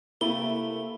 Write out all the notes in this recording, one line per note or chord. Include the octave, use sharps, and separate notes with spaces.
C3 A3 A#3 E4 G7